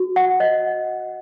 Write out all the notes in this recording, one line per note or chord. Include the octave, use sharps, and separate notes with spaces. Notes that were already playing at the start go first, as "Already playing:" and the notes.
Already playing: F#4
F#5
D#5